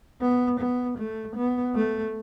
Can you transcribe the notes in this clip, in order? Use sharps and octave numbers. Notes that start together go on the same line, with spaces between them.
B3
B3
A3
B3
A3